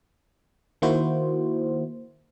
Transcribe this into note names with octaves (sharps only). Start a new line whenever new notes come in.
D#3 A#3 E4 F#4 C5